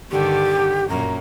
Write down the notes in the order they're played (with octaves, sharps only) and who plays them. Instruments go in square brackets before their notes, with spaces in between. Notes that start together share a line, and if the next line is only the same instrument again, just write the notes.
[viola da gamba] G2 D3 D#3 [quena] G4
[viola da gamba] F#2 A#2 [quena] A#5